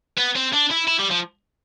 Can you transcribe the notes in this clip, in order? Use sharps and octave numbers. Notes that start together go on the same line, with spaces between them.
B3
C4
D4
E4
E4
G3
F3